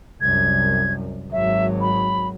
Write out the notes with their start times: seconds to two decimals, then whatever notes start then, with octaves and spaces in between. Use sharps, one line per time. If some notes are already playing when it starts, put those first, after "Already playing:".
0.21 C2 F#2 G#6
1.32 G#1 F#3 E5
1.81 B5